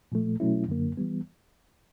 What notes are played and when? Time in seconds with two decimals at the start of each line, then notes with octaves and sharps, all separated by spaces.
0.12 A#2 F3 A3
0.40 B2 F#3 A3 C#4 E4
0.69 F#2 D3 F#3 A#3
0.97 E3 G3 B3